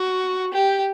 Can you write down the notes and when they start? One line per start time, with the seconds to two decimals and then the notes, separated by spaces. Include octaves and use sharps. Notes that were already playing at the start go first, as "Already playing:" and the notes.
Already playing: F#4
0.53 G4